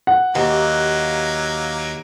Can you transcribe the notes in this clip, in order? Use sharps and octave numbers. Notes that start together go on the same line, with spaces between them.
F#5
D#2 F#3 A#3